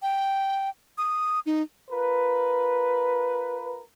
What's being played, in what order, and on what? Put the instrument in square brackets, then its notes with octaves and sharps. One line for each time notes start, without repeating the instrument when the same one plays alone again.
[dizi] G5
D#6
D#4
[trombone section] F4 A#4 B4